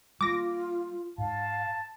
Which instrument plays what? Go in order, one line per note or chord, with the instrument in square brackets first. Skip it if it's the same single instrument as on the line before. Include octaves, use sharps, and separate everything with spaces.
[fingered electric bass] G3 A#3 [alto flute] F4 [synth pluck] D6 A#6
[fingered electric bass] G#2 [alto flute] F5 [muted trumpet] A5